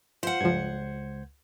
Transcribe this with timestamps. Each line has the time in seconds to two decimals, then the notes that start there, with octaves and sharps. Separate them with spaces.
0.23 F4 C5 F5 F#5
0.41 C#2 G2 F3 G#6